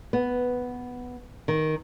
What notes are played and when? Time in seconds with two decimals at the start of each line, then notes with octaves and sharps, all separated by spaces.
0.13 B3
1.48 D#3